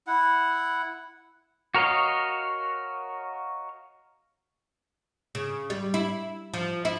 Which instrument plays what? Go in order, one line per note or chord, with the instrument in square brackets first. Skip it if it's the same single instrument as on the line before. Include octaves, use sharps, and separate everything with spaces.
[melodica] E4 F#5
[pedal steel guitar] F#4 A#4 C#5 D#5 F5
[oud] C#3
G3
E4
F3
E4